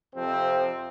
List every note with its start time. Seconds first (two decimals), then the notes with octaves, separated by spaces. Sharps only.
0.14 F2 C3 F3 C4